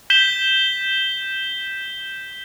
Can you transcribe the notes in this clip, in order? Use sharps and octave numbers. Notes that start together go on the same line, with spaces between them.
G6 B6 E7 G7